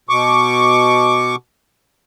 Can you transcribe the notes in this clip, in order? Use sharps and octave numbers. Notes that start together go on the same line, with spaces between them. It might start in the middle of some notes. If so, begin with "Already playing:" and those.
B2 C#6 D6